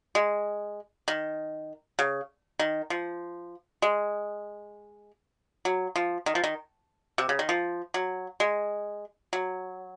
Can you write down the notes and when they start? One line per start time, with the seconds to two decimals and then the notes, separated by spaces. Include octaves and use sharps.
0.15 G#3
1.08 D#3
1.99 C#3
2.59 D#3
2.90 F3
3.82 G#3
5.65 F#3
5.96 F3
6.26 D#3
6.35 F3
6.44 D#3
7.18 C3
7.29 C#3
7.39 D#3
7.49 F3
7.94 F#3
8.40 G#3
9.33 F#3